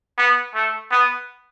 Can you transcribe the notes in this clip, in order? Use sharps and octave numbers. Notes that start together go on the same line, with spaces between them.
B3
A3
B3